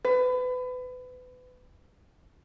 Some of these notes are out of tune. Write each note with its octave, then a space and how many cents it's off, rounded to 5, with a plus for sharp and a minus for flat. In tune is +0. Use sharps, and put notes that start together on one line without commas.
B4 +30